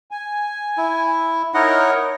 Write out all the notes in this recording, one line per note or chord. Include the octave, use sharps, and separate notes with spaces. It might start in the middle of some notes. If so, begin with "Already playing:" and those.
G#5
E4
D#4 E4 A#4 C#5 D#5 F#5